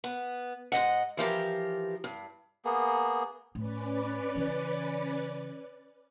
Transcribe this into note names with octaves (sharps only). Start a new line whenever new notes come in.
B3
G#2 C#3 D#5 F#5
E3 F3 G4 A#4
G2
A#3 B3 G#4
A2 C#4 B4 D5
C#3 E3